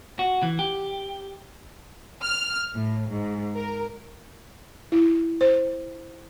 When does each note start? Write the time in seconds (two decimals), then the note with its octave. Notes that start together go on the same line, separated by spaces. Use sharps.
0.19 F#4
0.43 E3
0.59 G4
2.23 F6
2.74 A2
3.11 G#2
3.56 A#4
4.92 E4
5.41 C5